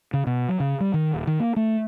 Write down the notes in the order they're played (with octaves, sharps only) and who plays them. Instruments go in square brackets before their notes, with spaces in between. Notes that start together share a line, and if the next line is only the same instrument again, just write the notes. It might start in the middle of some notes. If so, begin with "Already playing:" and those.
[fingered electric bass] C#3
B2
F#3
C#3
G3
D#3
D#1
D#3
A#3
A3